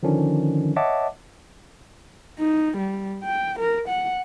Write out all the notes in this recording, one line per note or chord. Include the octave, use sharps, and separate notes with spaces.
D3 D#3 F3 C#4 D4
C#5 D#5 E5 F#5 A5 D6
D#4
G3
G5
A#4
F#5